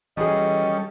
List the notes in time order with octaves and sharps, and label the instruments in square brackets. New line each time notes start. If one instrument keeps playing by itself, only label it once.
[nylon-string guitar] E3 F#4 G#4 [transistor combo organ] G3 C#4 A4 [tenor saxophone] D#5